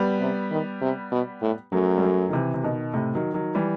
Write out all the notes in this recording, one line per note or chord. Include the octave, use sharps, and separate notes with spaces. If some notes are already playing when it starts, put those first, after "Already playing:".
Already playing: G3 B3
C3
D#3
C3
B2
A2
F#2 F#3 A3
G3
F#3 A3
D#3
C3 E3
C3
B2 D#3
A2 C3
D#3 F#3
D#3 F#3
E3 G3